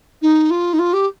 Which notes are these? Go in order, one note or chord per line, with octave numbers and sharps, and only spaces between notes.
D#4
F4
D#4
F4
G4